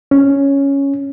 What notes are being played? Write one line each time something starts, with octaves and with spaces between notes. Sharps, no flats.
C#4